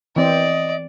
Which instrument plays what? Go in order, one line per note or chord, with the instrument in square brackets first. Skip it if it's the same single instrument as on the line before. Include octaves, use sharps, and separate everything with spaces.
[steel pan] E3 C4 [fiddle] D5 [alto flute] D#5